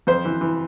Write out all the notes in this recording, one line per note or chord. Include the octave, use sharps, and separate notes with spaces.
F2 C5
E3
E3